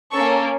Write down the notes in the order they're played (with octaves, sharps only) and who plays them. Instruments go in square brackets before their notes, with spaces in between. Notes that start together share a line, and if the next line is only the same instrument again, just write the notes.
[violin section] A#3 C#4 A4 C#6